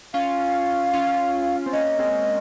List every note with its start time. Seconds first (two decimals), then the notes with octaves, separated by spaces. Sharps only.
0.13 C#4 F4 F5
0.93 C#4 F4
1.66 C4
1.73 A#3 C#4 D#5
1.99 G#3 C4